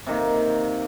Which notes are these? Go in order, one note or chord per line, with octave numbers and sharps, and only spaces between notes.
C3 D#3 A#3